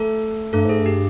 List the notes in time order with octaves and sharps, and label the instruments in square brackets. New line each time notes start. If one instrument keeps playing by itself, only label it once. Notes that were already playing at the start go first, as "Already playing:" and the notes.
Already playing: [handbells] A3 A4
[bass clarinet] G2 [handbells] A3 A4
[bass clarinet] G#2 [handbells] G#4
[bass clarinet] G2
[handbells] G4